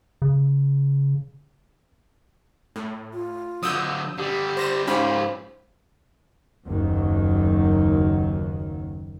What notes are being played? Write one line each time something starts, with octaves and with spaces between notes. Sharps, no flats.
C#3
A2
F4
D3 F#3 D#6 E6 G6
D3 G3 G4
C5 A#6 E7
G#2 C#4 F4 G4 C5 B5
F#1 D#2 D#3 F#3